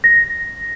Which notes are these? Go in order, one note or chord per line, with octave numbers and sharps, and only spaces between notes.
A#6